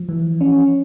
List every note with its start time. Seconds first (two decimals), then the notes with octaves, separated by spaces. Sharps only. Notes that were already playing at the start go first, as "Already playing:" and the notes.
Already playing: F3
0.09 E3
0.41 C#4